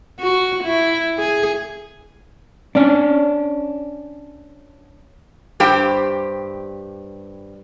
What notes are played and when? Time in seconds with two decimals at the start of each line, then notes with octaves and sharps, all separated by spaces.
0.19 F#4
0.64 E4
1.18 G#4
2.75 C#4 D4
5.60 G2 G4 C5 G5